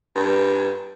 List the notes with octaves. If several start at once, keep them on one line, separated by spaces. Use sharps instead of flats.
G2